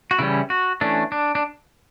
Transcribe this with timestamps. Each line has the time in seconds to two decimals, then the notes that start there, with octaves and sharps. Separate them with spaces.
0.11 F#4
0.19 C#3 E3 G3 C#4 E4
0.50 F#4
0.81 E3 A3 C#4 D4
1.12 D4
1.35 D4